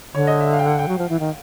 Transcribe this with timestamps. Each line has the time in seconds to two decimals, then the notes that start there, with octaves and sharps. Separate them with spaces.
0.15 D3 C#5
0.27 D#5
0.41 E5
0.53 F5
0.59 G5
0.66 F#5
0.79 G5
0.88 F#3
0.98 F3
1.09 E3
1.20 D#3